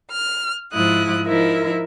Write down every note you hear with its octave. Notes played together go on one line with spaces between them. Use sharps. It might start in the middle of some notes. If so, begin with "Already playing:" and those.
F6
G#2 F3 E4 D#6 F#6
F3 D#4 E4 A#4 E5